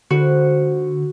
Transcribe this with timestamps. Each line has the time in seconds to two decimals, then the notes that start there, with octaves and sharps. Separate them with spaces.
0.10 D3 F3 G#3 E4 F#4